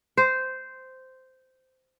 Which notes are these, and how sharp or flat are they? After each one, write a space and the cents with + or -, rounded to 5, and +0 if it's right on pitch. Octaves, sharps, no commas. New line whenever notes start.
C5 -10